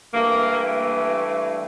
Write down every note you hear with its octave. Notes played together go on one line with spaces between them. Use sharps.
G2 E3 A3 A#3